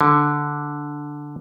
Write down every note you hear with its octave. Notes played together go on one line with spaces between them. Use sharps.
D3